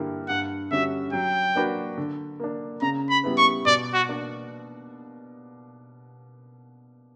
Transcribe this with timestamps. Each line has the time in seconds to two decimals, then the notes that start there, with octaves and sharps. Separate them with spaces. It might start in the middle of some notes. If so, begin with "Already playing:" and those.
Already playing: G2 D3 A#3 E4 G4
0.28 G2 F#5
0.71 D3 G3 C#4 F#4 E5
1.13 F#3 G5
1.55 A#3 D4 F#4 B4
1.97 D3
2.40 A#3 D4
2.82 C#3 A#5
3.10 B5
3.24 G3 B3 E4 B4
3.38 C#6
3.66 B2 D5
3.94 F#4
4.08 A#3 D4 A#4